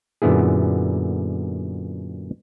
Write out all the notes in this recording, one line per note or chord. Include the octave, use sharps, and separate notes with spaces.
F#2 A#2 D3 B3 E4 G#4